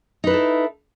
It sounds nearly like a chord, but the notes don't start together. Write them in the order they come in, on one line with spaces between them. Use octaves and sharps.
D#4 B4 E4 A4